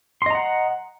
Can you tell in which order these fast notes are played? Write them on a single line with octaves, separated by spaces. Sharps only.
C6 D#5 A#5 F#5